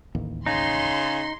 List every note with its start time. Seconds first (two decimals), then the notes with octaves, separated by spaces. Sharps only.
0.15 D1 A1 D#2
0.46 C#3 D#4 C6